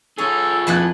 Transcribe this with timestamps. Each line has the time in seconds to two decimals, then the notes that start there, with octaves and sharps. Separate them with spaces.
0.18 F4 G#4 A4 C#5
0.67 F2 E4 B4 A5 F#6